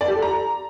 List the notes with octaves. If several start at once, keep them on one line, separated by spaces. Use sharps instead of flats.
D5
G4
A4
A#5